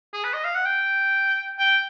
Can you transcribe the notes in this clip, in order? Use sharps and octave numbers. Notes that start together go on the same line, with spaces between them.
G#4
B4
D#5
F5
F#5
G5
G5